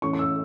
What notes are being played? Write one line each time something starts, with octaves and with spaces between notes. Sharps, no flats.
A2 E3 C#4 C#6
C#6
E6